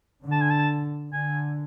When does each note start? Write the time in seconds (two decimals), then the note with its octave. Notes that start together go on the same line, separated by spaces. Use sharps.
0.22 D3
0.32 A5
0.41 G#5
0.50 A5
1.13 D3 G#5